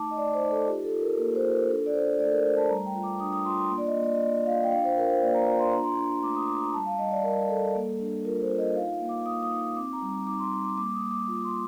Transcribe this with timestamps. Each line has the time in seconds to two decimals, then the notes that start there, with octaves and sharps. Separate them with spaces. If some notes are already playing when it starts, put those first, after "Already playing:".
Already playing: A3 D#4 A5 D6
0.11 D#5
0.17 A3 D5
0.34 C5
0.42 D#4
0.51 A4
0.67 F4 G4
0.85 A4
0.93 F4
1.01 A#4
1.18 A#3 A#4
1.35 C5
1.43 F4
1.52 A#4
1.69 D4 A4
1.86 D5
1.94 D4 C5
2.19 A3 D5
2.26 A4
2.31 A#4
2.44 A3 C5
2.57 A5
2.70 G3 A#5
2.86 G5
2.95 F4
3.03 D6
3.20 D4 D#6
3.33 D#6
3.45 F4 C6
3.58 C6
3.70 A#3
3.78 D5
3.87 D#5
3.95 A#3
4.04 D5
4.15 D#5
4.21 A#3 D5
4.46 F4 F5
4.63 G5
4.71 D4 F5
4.84 C5
4.97 F4 A#4
5.09 C5
5.22 A#3 D5
5.34 A#5
5.47 F4 A#5
5.60 C6
5.72 D4 A#5
5.84 C6
5.98 D4
6.23 A3 D6
6.36 D#6
6.48 D4 D6
6.61 A#5
6.73 G3 A5
6.86 F5
6.99 G3 D#5
7.11 D5
7.24 G3 A#4
7.49 G3 A4
7.75 A#3
8.00 D4
8.25 F4 A#4
8.42 C5
8.50 F4
8.59 D#5
8.75 D#4 F5
9.00 A#3
9.09 D6
9.26 A#3 D#6
9.43 D#6
9.51 D#4
9.60 D#6
9.76 C4 D6
9.93 A#5
10.02 G3
10.27 D#4 D6
10.39 C6
10.52 G3
10.65 D6
10.77 A#3 D6
10.94 D#6
11.03 A#3
11.11 D6
11.28 F4
11.44 C6